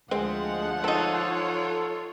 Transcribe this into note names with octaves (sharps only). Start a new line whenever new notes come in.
D2 F3 G#3 C4 F#5
C4 D#4 F4 A4 C#5